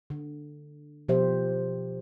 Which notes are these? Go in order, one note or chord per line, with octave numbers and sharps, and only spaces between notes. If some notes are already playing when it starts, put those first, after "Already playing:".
D3
B2 F3 G4 C5 E5